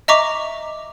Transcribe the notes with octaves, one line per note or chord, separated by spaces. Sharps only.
D#5 E5 A#5 C#6 D6